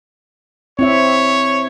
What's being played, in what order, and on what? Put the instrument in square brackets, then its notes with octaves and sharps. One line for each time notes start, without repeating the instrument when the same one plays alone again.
[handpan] C4 E4 E5 [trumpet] C#5